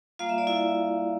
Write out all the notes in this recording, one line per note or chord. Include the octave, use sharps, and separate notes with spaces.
G3 A#3 F4 F5
E5
D5
E4 E5